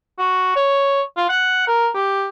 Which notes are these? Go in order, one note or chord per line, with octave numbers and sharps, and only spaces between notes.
F#4
C#5
F4
F#5
A#4
G4